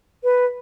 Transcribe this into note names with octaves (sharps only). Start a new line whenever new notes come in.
B4